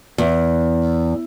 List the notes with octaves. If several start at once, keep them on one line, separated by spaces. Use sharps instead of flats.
E2